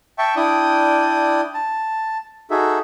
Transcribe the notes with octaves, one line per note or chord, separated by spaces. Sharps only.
E5 G5 A5 C#6
D4 E4 D5 G5 D#6
A5
D#4 F#4 G#4 A4 E5